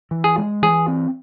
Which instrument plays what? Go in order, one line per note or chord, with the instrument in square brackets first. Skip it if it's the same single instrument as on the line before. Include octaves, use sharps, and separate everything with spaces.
[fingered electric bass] E3
[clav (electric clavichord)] G#4
[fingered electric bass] G#3
[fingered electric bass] E3 [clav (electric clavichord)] G#4
[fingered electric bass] C4